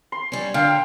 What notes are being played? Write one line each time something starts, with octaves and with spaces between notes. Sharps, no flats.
C6
G3 C#4
D3 F5 G5